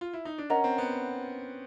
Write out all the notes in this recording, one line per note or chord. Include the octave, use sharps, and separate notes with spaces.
F4
E4
D#4
D4
C#4 A#4 D#5 F#5 A#5
C4
B3